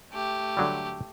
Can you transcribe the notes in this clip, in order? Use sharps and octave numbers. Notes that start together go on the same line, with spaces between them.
A3 G4
D3 F#3 G3